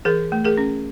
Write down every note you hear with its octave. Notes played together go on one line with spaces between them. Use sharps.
E3 G#4 A#4
A3
G#4 A#4
C#4